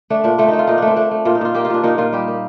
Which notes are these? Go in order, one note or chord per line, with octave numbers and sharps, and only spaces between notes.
A3 D4
A#2 D4
A3 C4
A3 D#4
F4
A#2 D#4
A3 D4
C4
A3 D4
A3
A#2 F4
D#4
A#2 F4
A#3 G4
F4
A#2 D4
A#2 D#4
A#2 F4
G3 G4
A#3